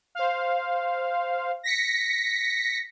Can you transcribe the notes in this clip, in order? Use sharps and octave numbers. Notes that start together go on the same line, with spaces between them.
C5 F5
A#6 B6 C#7